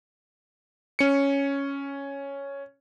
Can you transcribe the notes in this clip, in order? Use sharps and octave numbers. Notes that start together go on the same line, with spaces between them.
C#4 C#7